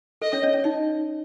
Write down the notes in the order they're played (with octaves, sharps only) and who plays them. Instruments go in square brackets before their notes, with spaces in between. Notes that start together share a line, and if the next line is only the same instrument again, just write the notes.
[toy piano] A4 [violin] D#5
[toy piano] C#4 C#5
C#4 C#5
C#4 C#5
D#4 D#5